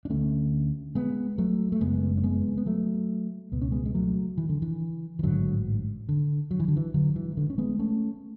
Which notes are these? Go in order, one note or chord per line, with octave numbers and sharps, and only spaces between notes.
D4
D2 D3 A3 C#4
G#3 B3
F#3 A3
A3
F#1 F#2 C#3 G#3 B3
C#4
G#3 B3
B3
F#3 A3
C#2 B2 B3
C#4
G#3 B3
G#3
F#3 A3
E3
D3
E3
E3
A1 G#2 D3 F#3
D3
F#3
E3
D3
E3
G#1 G#2 D3 F#3
E3
D3
C#4
G#3 B3
A3 C#4